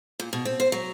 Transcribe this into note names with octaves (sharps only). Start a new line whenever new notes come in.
A#2
B2
C4
C5
F#3